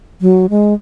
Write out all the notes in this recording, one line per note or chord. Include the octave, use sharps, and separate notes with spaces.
F#3
G#3